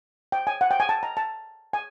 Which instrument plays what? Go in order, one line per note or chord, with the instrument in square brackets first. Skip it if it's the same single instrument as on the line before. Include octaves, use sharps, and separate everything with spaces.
[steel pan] G5
G#5
F#5
G5
G#5
A5
A#5
A5
G#5